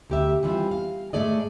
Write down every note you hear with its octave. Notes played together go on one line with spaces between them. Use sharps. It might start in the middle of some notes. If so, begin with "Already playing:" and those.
D2 G4 E5
E3 G3 C4 E4 F4
F5
G#2 A3 G#4 D5 D#5